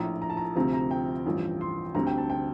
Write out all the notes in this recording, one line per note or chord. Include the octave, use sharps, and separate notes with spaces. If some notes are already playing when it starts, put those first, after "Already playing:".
Already playing: A#1 A2 F3 A#5
A#5
A5
A#5
D2 C3 F3 C4 A#5
A#5
G5
A1 G2 F3
C6
D2 D3 G3 C4 A#5
G5
A5
G5